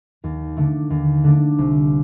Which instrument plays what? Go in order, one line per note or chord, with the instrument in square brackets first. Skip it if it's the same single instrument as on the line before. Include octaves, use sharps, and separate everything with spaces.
[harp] D#2
D3 A3 D4
D#2
D3 A3 D4
C2